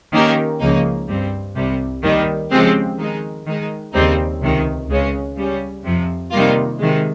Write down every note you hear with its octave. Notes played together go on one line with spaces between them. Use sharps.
D#3 A#3 C#4 G4 A#4
C#2 C#3 F3 A#3 D#4
G2 G3 C4
C2 C3 G3
D#2 D#3 G3
C#3 F3 G#3 C4 G4
D#3 G#3 D#4
D#3 G#3 D#4
D#2 C#3 G3 C4 D#4
C#2 C3 D#3
C#2 C#3 G#3 C#4
C#3 G3 C#4
F2 C3 F3
C3 D#3 G3 A#3 F4
C3 D#3 G#3